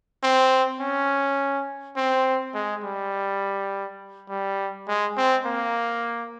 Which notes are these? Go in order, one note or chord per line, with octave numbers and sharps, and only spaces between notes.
C4
C#4
C4
G#3
G3
G3
G#3
C4
A#3